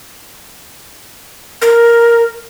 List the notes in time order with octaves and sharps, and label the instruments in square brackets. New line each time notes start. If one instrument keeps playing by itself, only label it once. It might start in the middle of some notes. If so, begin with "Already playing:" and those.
[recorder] A#4